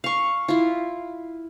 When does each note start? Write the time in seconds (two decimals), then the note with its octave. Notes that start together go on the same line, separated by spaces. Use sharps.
0.04 F5 C#6
0.48 E4 F4